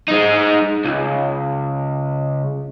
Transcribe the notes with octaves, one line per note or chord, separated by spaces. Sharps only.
G#3 D#4
C#2